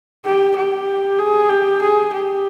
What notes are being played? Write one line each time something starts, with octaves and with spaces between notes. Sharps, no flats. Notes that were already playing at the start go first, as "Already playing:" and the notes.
G4
G4
G#4
G4
G#4
G4